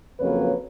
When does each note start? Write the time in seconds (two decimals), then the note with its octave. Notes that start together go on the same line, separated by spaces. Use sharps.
0.20 F2 C#3 F#3 A#3 B4 C#5